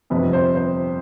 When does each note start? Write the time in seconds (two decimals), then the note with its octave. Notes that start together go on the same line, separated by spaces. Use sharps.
0.10 G1 F2 C3 B4
0.33 C5
0.55 C5